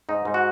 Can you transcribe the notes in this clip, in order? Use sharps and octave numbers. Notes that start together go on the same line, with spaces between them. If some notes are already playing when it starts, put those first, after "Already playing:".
G#2 D#4
G#2
F#4